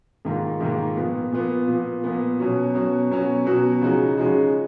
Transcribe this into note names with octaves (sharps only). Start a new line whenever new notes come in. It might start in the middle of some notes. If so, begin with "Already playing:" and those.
G#2 D#3 A#3 F4
G#2 D#3 A#3 F4
A#2 F3 B3
A#2 F3 B3
A#2 F3 B3
A#2 F3 B3
B2 F#3 C#4 F#4
B2 F#3 C#4 F#4
B2 F#3 C#4 F#4
B2 F#3 C#4 F#4
C#3 F3 G#3 D#4 F#4
C#3 F3 G#3 D#4 F#4